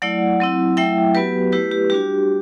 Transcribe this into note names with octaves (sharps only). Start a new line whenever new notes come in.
F#3 A3 E4 D5 F#5
F#3 C4 E4
F#3 A3 E4 E5 G5
F#3 B3 F#4 G4 B4
A3 E4 G4 B4
G4
G3 D4 F#4 G4